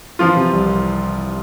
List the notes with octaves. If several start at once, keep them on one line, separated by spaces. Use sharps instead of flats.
E3 F3 F4
C3
C2